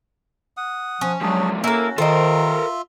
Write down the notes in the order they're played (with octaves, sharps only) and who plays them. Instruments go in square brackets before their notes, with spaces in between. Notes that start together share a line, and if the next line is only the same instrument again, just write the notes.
[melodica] F#5 D#6
[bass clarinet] F3 [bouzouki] C#4
[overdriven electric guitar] F3 G#3 [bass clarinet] F#3 [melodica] D4 G#4
[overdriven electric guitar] A#3 [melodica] C#4 F#4 [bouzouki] E4 A4 [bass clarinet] A#4
[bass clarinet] D#3 [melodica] F4 E5 [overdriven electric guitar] A4 A#4 [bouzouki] C5 D#5